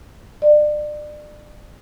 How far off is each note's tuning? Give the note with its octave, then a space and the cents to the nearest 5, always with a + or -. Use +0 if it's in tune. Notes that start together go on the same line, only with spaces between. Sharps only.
D5 +30